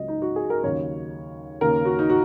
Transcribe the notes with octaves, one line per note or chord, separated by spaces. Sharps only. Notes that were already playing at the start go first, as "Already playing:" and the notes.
Already playing: C#2 C#3 F#3 A#3 D#5
D#4
F#4
G#4
A#4
D#2 C#3 F#3 C#5
D#2 C#3 A#3 A#4
F#4
D#4
F#4